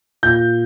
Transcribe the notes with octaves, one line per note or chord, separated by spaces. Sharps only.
A#2 G6